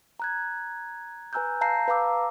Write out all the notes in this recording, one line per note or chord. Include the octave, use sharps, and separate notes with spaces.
A#5 F#6 G#6
B4 G#5 A#5 E6 F#6 G6
F5 A5 A#5 G6 A#6 C7
B4 F5 A5 A#5 D6 E6